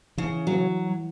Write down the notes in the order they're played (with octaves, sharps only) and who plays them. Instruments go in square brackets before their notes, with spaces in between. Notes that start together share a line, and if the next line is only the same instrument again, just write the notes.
[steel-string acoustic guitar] C#3 [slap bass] E3
[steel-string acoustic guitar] F#3